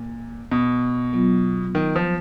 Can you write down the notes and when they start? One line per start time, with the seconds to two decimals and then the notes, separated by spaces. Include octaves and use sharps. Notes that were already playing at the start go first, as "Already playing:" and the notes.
Already playing: A#2
0.51 B2
1.13 F#3 B3 F4
1.75 D#3
1.96 F3